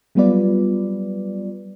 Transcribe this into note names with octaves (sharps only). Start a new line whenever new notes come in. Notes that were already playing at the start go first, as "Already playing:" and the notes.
F#3 G3 B3 F4 B4 D5